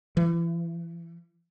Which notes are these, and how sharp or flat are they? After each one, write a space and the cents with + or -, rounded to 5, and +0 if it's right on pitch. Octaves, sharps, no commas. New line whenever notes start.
E3 +35